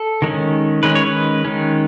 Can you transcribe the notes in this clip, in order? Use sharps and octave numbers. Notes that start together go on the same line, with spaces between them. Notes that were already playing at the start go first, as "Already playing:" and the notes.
Already playing: A4
D#3 G#3 C#4
D#3 G#3 C#4 B4
C#5
B4
D#3 G#3 C#4